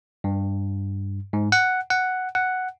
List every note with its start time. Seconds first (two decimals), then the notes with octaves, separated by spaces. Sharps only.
0.24 G2
1.33 G#2
1.52 F#5
1.90 F#5
2.35 F#5